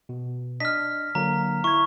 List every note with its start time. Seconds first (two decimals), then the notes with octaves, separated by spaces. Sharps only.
0.09 B2
0.60 D4 D#5 F6 B6
1.15 D3 F#3 A#3 A#5
1.64 E4 C#6 G#6